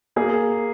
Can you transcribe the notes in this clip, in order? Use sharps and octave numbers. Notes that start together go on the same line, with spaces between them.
A#3 G#4